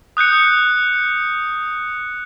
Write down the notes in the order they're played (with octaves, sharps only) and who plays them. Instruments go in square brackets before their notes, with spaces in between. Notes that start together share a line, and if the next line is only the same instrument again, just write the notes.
[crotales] D#6 F#6 G6 C#7